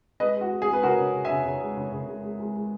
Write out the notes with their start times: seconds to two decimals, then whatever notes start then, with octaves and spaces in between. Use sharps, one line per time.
0.20 G#3 B4 D#5
0.36 G#3 F#4
0.52 G#3
0.62 G#4
0.67 G#3
0.73 B4
0.82 C#3 F#4 A#4
0.98 C#3
1.14 C#3
1.25 E5 G#5
1.30 C#3
1.46 C#3
1.61 G#3
1.77 C#3
1.92 C#3
2.08 G#3
2.24 G#3
2.40 G#3
2.56 G#3